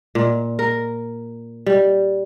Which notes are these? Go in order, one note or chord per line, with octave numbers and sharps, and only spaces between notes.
A#2
A#4
G3